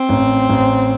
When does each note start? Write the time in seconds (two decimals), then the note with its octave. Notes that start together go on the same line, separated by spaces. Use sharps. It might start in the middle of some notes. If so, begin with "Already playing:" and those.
Already playing: C4
0.09 A1
0.49 A1